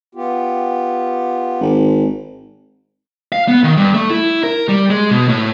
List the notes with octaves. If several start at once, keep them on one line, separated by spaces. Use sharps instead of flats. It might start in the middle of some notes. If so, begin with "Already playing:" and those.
B3 F4 G4
G#1
F5
B3
D#3
G2
A3
E4
A#4
G3
G#3
B2
A2